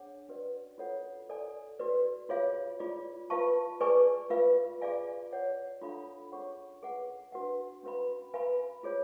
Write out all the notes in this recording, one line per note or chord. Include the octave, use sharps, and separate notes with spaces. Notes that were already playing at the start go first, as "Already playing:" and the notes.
Already playing: D4 G#4 C#5 F#5
C#4 F#4 B4 D5
F4 A4 C#5 F#5
A4 D5 G#5
F#4 B4 D5
F4 G#4 C#5 F5
F4 G#4 D5
F4 B4 F5 A5 C#6
G#4 B4 D5 G#5 C#6
F4 B4 F5
F4 G#4 D5 F5 G#5
G#4 C#5 F#5
D4 F4 A4 F5 B5
C#4 G#4 C#5 F#5 C#6
G#4 B4 F#5
D4 F#4 B4 F#5
C#4 F#4 B4 F5 B5
B4 F5 G#5 B5
F4 G#4 C#5